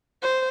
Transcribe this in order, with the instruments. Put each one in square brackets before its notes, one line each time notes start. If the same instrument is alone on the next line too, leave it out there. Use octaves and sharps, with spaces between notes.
[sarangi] C5